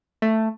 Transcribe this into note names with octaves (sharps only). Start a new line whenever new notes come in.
A3